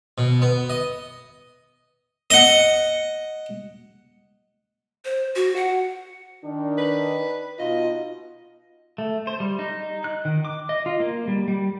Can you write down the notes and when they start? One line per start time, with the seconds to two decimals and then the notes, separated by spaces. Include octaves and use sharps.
0.18 B2
0.42 B3
0.69 D#5
2.30 D#5 F#5
5.05 C5
5.36 F#4
5.56 F#5
6.44 D#3 D4
6.78 B4
7.59 B2 D#4 F4 D#5
8.98 A3
9.27 C5
9.40 G3
9.59 D#4
10.04 F#6
10.25 D#3
10.45 D6
10.69 D#5
10.86 F4
11.00 A#3
11.28 G3
11.48 G3